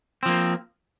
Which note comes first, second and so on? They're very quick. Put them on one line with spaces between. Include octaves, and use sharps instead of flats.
C4 F3 A#3